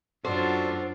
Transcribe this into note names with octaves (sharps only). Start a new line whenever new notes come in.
F#2 D4 F4 F#4 A4 C5 D5